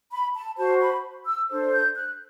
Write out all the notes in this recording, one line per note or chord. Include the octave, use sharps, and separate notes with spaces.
B5
A5
F#4 C5 A5
B5
E6
D4 A4 C5
G6
F#6